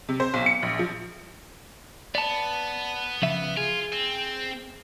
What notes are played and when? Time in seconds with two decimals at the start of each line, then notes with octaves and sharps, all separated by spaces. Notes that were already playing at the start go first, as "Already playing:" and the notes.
0.09 C3
0.20 C5
0.34 B1
0.46 C#7
0.63 A#1
0.79 F3
2.15 B3 D5 A5
3.22 C#3 F3 E5
3.57 F4 G#4
3.93 C4